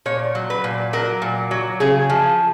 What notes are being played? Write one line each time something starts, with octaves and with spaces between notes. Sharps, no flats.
A#2 C#5
F#3
B4
A#2
F#3 A#4
A#2
F#3
C#3 G#4
F3